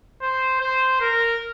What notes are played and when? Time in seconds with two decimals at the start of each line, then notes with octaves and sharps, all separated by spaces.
0.22 C5
0.61 C5
1.01 A#4